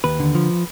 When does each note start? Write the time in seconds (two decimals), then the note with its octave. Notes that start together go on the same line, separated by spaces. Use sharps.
0.04 D#2 B4
0.20 D3
0.35 F3